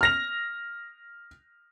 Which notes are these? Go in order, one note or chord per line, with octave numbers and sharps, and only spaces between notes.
F6 A#6 F7